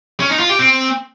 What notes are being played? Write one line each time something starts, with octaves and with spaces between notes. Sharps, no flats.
C#4
D#4
F4
G4
C4